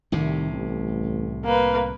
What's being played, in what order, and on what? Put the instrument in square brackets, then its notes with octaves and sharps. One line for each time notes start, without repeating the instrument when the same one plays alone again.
[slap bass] C2 A2 C3 [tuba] D#3
[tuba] A1
[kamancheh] A#3 B4